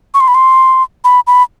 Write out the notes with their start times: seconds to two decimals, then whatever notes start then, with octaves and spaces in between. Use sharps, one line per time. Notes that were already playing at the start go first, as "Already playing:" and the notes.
0.14 C#6
0.21 C6
0.28 B5
0.35 C6
1.04 B5
1.27 B5